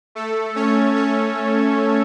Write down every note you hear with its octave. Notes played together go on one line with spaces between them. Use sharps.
A3 A4
C#4 C#5
C#4 C#5